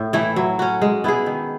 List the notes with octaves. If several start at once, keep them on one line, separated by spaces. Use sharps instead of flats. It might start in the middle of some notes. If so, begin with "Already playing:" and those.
Already playing: A2
E3 A3 E4
F#3
C#4 F#4
G#3
B3 E4 G#4
D#3